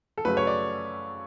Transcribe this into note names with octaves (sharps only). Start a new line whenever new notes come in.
A4
F#2 C#3 F#3 A3 B4
C#5
D5